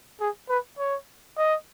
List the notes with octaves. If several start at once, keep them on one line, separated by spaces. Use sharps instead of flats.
G#4
B4
C#5
D#5